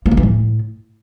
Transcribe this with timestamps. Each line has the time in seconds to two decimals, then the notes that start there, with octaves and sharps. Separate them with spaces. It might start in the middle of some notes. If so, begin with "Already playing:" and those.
0.06 A#3
0.11 D#3
0.17 E3
0.23 A2